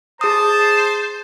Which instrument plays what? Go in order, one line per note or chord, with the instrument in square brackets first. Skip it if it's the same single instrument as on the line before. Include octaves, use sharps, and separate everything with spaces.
[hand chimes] G#4 D#6 [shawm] C5 [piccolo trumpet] A5